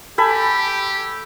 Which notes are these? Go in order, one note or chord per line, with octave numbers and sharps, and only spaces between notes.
G4 A4 G#5 B5